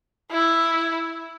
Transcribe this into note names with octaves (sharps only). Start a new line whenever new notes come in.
E4